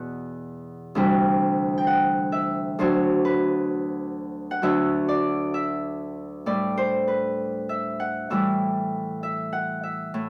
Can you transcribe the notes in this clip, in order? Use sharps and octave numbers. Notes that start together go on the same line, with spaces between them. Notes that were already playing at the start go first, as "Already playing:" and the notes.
Already playing: E2 B2 F#5
D2 C3 E3 G3
G5
F#5
E5
D2 D3 F#3 C5
B4
F#5
D2 D3 F#3 E5
D5
E5
A2 G3 D5
C5
B4
E5
F#5
A2 E3 G3 E5
E5
F#5
E5
A2